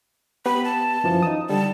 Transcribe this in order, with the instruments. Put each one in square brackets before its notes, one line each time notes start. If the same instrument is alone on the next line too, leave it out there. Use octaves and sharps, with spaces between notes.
[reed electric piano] B3 G4 B4 [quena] B5
[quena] A5
[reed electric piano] F#2 E3 F3
D#4 D#6
[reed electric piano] D3 G3 [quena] A5